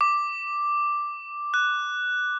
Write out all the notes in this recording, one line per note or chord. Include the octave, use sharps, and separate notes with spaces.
D6
F#6